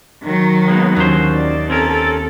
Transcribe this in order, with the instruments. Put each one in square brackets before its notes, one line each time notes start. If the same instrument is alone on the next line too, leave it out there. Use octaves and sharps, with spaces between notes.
[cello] D#3 F#3
[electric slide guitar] G#3 A#3 B3
[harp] D#2 [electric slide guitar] F#3 C#4 C5
[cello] D5
[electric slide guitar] C4 C#4 A#4 [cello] A4